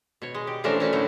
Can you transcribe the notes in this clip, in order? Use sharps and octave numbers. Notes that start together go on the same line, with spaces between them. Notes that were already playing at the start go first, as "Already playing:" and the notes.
B2 C#5
G#3
G4
E3 F3 A3 C#4 D4 A#4
A3 C#4 F#4 B4
A2 D3 F#3 A3 E4